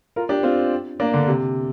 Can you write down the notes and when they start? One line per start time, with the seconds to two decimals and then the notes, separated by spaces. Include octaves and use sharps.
0.16 F4 A#4
0.29 D4 G4
0.43 C4 F4
1.00 A#3 D4
1.14 D3
1.28 C3